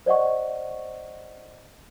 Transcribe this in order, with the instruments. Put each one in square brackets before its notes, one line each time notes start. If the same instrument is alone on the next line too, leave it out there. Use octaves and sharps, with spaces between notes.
[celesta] C5 D5 D#5 F#5 C#6